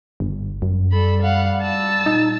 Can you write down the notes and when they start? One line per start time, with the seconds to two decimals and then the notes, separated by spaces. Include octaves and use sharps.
0.20 G1
0.62 F#2
0.92 G3 A4 B5
1.22 F5 F#5
1.62 A5 E6
2.06 A#2 D#4